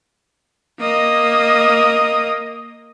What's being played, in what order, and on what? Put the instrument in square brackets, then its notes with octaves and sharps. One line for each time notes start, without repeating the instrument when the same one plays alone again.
[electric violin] A#3 D#5